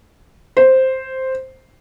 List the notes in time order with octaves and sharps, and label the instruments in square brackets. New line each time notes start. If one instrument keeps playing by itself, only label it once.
[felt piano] C5